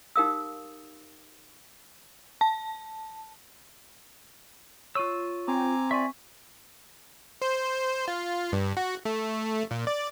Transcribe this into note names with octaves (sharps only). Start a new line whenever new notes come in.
D#4 G4 A#4 F5 D#6 E6
A5
F4 C#5 C#6 E6 D#7
C4 G#5 A#5 D6
F4 D5 E5 G#5 C#6
C5
F4
G2
F#4
A3
A#2
D5